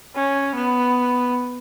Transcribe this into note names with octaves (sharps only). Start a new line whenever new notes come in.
C#4
B3